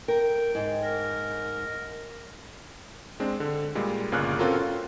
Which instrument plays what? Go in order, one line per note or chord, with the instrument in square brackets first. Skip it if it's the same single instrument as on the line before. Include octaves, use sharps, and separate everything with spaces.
[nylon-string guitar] A#4 [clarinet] G5
[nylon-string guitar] G#2
[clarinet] A#4
[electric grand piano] G#3 C4 D4
D3
A#2 G3 G#3
G1 A#2 C#3 F6 F#6
C4 C#4 F4 F#4 A4 A#4
F4